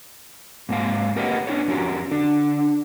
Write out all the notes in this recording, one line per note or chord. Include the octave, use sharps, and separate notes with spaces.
G#2 A#3 C4 F5
G4 A#4 B4 C#5 D#5 F#5
B3 C#4 D4 F4 A4 C#5
F2 C#4 F#4 G4 A#4
D3 D4